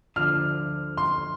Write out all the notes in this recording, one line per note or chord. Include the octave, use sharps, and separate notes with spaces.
D2 D3 F3 F6
C6